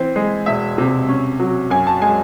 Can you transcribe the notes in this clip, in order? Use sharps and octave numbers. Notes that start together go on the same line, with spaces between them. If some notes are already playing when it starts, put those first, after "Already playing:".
Already playing: E3 C4
G#3
E1 E5
C3
C#4
F#3
F#2 G#5
A5
G#3 G#5